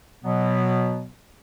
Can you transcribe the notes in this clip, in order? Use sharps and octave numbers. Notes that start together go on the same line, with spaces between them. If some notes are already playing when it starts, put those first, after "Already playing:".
B2 F#3 B3